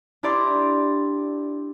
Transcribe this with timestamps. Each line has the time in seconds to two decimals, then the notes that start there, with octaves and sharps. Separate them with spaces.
0.23 D4 E4 G4 D5 A#5 C6